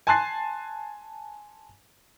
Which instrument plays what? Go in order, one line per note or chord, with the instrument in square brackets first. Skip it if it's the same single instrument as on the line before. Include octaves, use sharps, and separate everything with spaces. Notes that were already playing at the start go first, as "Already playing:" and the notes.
[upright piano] G#5 A5 C6 F#6 A6 C7